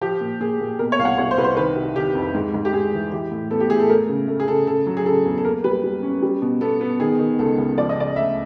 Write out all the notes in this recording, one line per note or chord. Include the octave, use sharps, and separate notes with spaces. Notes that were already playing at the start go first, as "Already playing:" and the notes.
F3 G4
A#2
A#2 G#4
A#2
B2 A#4
C#5
C2 F5
F#5
C2 C#5
C5
C2 B4
C5
D#3 B4
C3
D#3 G4
F2
G#2
G#2
G4
G#2 G#4
E3
E3 G4
A2
B3 A4
G4
A2 G#4
A4
A3 A#4
C#3
A3
G#4
C#3 A4
C#3 A4
F#3
G#4
C#3 A4
E2
A4
A#3 A#4
G3 B4
G3
C#4
G3
B2
B3 A4
B3
D#3 G#4
D#3
C#2 A4
C#2
F3 D5
D#5
C#3 D5
D2 E5